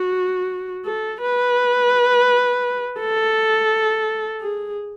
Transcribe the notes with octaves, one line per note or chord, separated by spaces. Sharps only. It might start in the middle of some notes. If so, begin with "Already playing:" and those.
Already playing: F#4
A4
B4
A4
G#4